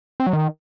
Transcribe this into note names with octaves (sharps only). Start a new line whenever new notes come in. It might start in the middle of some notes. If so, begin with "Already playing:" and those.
C4
F#3
D#3